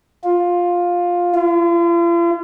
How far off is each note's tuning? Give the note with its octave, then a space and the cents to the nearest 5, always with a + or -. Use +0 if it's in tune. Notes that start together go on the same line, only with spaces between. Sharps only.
F4 +10
F4 -45